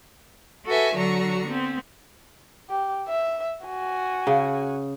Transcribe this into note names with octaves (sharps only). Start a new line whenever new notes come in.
F#4 A4 B4 E5 G#5
D3 F#3 F#4 A#5 C#6
B3 C4
G4
E5
F#4 G#5
C#3